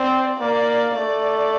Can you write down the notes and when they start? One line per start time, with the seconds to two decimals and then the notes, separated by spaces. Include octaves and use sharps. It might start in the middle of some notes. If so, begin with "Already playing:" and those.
Already playing: C4 D5
0.40 A#3 D5
0.95 A3 D5